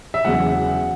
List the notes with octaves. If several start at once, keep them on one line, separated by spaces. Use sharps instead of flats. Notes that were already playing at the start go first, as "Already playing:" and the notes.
E5
E2 C#3 F#3 F#5